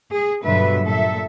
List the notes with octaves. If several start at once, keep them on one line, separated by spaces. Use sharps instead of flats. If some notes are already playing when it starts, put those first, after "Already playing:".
G#4
G2 B2 D3 F#3 B4 E5
A#2 A4 E5